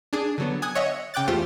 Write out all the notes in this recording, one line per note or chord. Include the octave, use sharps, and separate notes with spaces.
D4 G#4
D3 F#3 B3
G#5 D#6 F#6 G#6
C#5 D#5 E5 F#5
C#3 G5 D6 F#6 A6
E2 A3 F4 G4 C5 A6